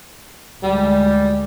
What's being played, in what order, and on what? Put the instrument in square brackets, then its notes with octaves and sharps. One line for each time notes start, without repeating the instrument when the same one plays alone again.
[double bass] D2 G#3 [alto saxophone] G3